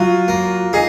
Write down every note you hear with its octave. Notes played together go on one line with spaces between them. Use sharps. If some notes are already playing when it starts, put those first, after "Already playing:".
Already playing: F#3 F4
A#3
D#4 G#4